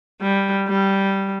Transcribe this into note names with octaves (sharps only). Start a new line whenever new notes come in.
G3
G3